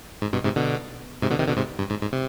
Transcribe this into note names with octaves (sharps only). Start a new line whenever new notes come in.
G#2
G2 B2
G#2 C3
B2 D3
G#2 C3
B2 D3
C3 D#3
B2 D3
G#2 C3
G2
G#2
G#2
C3